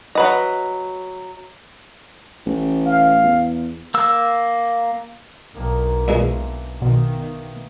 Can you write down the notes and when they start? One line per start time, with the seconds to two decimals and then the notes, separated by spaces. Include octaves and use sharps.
0.15 F#3 B4 D#5
2.46 A1
2.86 F5
3.23 E2
3.94 A#3 E6
5.54 B1 D#3 A#3 D4
6.08 E2 A#2 E3 G#3
6.82 B2 D#3